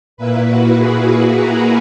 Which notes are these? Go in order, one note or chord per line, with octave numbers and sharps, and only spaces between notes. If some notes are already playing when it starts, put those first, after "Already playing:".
A#2 A#3 E4 B4
F#4
G#4
A#4